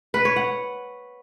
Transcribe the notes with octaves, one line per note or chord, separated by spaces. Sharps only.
B4
C#5
F#5